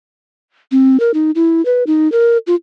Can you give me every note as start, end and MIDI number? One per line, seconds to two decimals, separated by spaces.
0.72 1.00 60
1.00 1.11 70
1.14 1.31 63
1.35 1.64 64
1.65 1.84 71
1.87 2.10 63
2.12 2.38 70
2.47 2.55 65